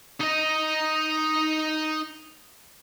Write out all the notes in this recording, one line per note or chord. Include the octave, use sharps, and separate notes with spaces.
D#4 D#5